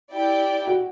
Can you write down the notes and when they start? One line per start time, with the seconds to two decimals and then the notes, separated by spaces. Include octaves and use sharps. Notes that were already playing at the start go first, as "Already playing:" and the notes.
0.13 E4 G4 D5 G5
0.67 F#4